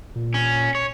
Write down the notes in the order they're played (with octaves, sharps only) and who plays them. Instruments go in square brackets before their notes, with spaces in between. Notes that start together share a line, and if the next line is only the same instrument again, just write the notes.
[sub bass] A#2
[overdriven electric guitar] C#4
C#5